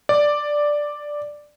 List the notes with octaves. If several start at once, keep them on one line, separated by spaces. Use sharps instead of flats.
D5